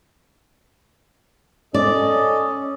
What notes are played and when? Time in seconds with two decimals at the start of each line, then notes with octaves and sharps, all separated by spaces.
1.74 C#4 A4 D5 D#5